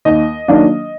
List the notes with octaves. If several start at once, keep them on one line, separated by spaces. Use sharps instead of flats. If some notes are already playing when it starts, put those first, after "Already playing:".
D#2 D#5
D#3 F#3 A#3 D4